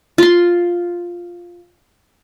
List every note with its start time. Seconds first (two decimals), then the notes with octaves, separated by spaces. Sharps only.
0.18 F4 C6